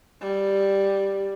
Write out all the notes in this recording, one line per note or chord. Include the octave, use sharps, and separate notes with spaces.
G3